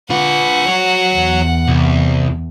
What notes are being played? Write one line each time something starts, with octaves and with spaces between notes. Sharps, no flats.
F4 B4 F#5
F#4 C#5
E2
C2